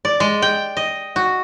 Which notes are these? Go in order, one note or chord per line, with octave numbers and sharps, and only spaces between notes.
D5
G#3
G5
D#5
F#4